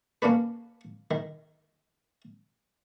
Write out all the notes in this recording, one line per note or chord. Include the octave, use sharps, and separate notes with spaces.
A#3 C#4 D4 B4
D#3